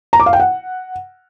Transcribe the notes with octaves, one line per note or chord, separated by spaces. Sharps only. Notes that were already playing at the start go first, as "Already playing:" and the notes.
A#5
D6
F5
G5
F#5